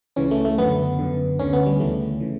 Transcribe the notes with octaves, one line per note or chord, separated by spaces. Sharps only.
C#2 C#3 E3 C#4
A3
A3
F#2 D3 B3
F#2 D3
D2 D3 C#4
B3
G3
D2 C#3 E3 A3
C#3 E3